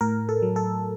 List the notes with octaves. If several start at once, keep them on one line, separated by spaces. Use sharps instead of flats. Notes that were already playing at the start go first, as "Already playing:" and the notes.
A2 A#4
A4
F#3
A4